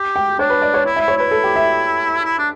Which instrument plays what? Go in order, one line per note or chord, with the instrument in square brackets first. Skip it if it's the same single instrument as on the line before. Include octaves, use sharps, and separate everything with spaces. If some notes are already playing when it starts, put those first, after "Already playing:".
Already playing: [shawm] G4
[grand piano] G5
[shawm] D4 [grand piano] C#5
[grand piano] B4
D5
C#5
[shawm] E4
[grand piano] E5
[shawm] E4
[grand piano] C#5
[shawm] E4 [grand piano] B4
[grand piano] A4
G4
E5
[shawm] E4
D4